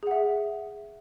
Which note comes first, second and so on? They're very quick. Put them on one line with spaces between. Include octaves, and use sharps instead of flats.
G#4 F#5 E5